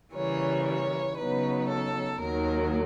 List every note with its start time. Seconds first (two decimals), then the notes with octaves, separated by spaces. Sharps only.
0.13 C#3 E3 G3 A#3 C#5
0.64 C#5
1.16 C#3 F#3 B3 D#4 B4
1.68 A4
2.20 D#2 D#3 F#3 A#4